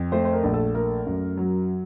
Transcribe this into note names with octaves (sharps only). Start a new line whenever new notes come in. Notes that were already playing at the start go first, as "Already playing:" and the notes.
Already playing: F2
A3 C5
C5
A#4
A#1
A4
A3 A#4
F#2
F#3